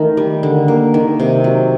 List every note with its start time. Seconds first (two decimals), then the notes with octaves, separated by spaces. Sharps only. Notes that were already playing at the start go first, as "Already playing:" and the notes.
Already playing: D#3 A3
0.17 G3
0.43 D3
0.68 A#3
0.94 D#3
1.20 C3
1.44 F#3